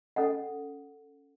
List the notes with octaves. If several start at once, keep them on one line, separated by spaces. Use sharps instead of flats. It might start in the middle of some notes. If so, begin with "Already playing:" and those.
C#4 A4 D#5 F#5